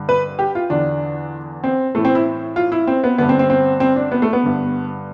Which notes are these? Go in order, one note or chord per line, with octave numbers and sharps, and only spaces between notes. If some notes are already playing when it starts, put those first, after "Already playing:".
Already playing: G2 D3
B4
G4
F4
E2 D3 D4
C4
A2 E3 A3
C4
E4
F4
E4
C4
B3
G2 D3 B3
C4
C4
C4
C4
D4
B3
A3
B3
G2 D3